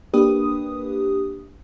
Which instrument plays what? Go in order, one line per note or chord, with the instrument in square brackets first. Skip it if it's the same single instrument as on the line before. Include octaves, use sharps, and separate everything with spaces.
[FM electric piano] A#3 D4 G4 B4 D#6